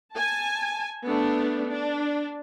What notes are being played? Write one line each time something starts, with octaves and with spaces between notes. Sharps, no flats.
G#5 A5
A3 B3 D4
D4